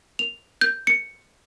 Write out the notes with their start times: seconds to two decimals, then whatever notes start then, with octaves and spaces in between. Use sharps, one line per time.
0.19 F7
0.61 G6
0.87 C#7